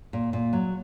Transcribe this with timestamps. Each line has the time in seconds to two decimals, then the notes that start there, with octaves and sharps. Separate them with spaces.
0.13 A#2
0.33 A#2
0.53 F#3